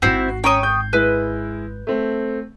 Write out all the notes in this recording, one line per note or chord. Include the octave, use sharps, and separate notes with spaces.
G#1 G#2 C4 E4 F#4 C7
C#4 G5 A#5 C#6 D#6
G6
G#3 E4 B4
A3 C4